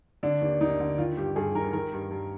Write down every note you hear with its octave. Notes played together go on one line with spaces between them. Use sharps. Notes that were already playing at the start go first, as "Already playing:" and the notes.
D3 D4
D#2
D#2 D#4
D3
D#3 F4
G2 G4
G2 G#4
D#3 A#4
D#3 A#4
G2
G2